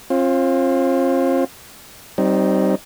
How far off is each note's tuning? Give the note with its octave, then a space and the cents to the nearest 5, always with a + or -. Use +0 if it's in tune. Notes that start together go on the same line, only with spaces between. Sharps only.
C4 +40 F4 +0
G3 -25 C4 +0 D#4 +0